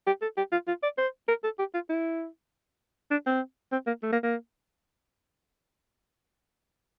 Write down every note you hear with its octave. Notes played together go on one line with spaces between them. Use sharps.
G4
A4
G4
F4
F4
D5
C5
A#4
A4
G4
F4
E4
D4
C4
C4
A#3
A3
A#3
A#3